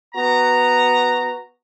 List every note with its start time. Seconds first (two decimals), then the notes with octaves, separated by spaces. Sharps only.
0.15 B3 F#4 A#5